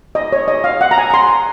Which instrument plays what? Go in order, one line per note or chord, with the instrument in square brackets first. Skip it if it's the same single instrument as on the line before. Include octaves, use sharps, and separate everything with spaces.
[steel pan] D#5
C#5
D#5
F5
F#5
A#5
G#5
A#5
C6